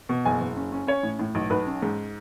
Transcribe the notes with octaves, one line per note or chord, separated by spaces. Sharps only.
B2
F#1 G#5
F#1
C#4
C#4
C#4 C#5
A2
A2
B1
B1 B4
C#4
G#2